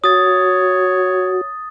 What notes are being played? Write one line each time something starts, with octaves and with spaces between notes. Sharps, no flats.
F#4 C#5 D#6 A6